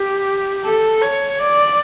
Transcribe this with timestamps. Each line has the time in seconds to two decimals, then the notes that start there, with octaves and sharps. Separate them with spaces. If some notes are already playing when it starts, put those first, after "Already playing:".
Already playing: G4
0.64 A4
1.01 C#5
1.39 D5